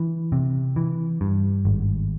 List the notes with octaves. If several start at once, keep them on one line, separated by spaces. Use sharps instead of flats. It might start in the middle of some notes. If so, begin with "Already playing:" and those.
Already playing: E3
C3
E3
G2
G#1